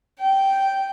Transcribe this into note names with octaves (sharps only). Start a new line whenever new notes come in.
G5